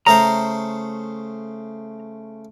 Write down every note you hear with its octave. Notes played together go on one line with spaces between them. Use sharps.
C#3 A3 C5 A#5